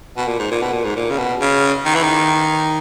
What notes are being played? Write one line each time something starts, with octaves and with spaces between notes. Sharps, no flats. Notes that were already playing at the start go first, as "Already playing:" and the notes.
B2
A#2
G#2
A#2
B2
A#2
G#2
A#2
C#3
B2
C#3
D#3
E3
D#3